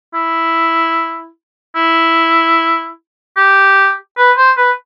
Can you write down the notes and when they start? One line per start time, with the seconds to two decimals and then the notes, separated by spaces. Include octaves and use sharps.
0.14 E4
1.76 E4
3.37 G4
4.18 B4
4.37 C5
4.57 B4